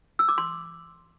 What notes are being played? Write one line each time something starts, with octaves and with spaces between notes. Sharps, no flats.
E6
D6
C6